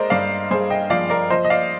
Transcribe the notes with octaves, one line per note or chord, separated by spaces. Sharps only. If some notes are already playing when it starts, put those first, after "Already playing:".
Already playing: G#3 A#4 C5 D5 D#5
G2 D5 F5
G2 G#4 C5
D#5 G5
F3 D5 F5
A#4 D5
F3 C5 D#5
D#5
D5 F5